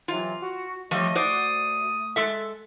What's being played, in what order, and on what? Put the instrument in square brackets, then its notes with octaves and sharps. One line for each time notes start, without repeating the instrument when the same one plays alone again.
[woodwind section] C3 E3 F#3 [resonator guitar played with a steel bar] F4
[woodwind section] F#4
[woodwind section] A2 A3 D#5 [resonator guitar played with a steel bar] F3 G3
[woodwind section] A3 D#6 [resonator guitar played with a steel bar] F#4 C5 D5
[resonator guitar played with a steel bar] G#3 A4 E5